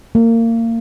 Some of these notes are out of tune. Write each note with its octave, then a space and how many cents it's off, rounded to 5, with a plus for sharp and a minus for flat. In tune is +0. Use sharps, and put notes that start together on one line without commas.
A#3 -30